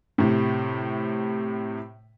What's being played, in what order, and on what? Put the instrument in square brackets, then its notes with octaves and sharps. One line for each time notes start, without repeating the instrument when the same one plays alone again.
[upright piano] A2 C3